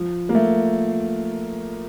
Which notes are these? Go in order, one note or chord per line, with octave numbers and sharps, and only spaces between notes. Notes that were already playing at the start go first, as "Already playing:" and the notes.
Already playing: F3
A#3
A3